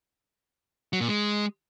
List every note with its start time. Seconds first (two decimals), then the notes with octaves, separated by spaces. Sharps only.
0.93 F#3
1.01 A#2
1.09 G#3